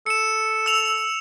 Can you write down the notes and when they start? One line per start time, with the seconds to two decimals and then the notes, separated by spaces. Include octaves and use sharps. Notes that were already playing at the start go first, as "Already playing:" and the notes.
0.06 A4 C#7 E7
0.66 E6 F7